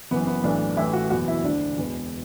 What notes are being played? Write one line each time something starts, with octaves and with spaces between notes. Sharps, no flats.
F#1 F#2 E3 B3
B3
B1 A2 E3 D4
A1 A2 E3 E4
F#4
F#1 E2 B2 F#4
E4
D2 D3 D4
E1 E2 B2